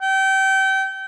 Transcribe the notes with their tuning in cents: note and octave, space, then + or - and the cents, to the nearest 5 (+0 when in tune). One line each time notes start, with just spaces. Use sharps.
G5 -30